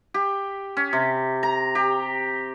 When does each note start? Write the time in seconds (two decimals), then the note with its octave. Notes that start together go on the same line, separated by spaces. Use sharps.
0.14 G4
0.77 C#4
0.93 C3
1.43 A#5
1.75 G4